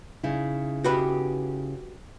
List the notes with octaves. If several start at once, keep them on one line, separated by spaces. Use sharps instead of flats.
C#3 D#4 E4
F#4 G4 B4